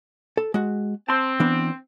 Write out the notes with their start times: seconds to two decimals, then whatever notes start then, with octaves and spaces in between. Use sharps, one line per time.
0.37 A4
0.54 G#3 F#4
1.09 C4 A5 C6
1.40 E3 B3 D4